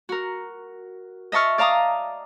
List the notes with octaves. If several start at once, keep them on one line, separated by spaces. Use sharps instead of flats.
F#4 A#4
D#5 E5 A5 C#6 F6
D5 F5 A5 A#5 D#6